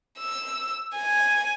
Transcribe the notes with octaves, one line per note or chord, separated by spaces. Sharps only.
E6
G#5